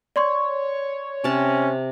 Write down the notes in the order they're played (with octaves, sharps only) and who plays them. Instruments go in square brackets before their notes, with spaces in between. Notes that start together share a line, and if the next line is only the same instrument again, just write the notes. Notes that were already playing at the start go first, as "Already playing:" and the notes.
[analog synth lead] C#5 [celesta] D5 C6 C#6
[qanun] C3 A5 [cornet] C#4